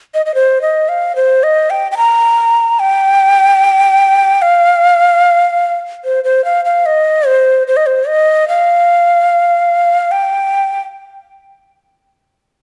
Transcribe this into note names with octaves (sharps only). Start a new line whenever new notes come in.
D#5
D#5
C5
D#5
F5
C5
D#5
G5
G5
A#5
G5
F5
C5
C5
F5
F5
D#5
C5
C5
D#5
C5
D#5
F5
G5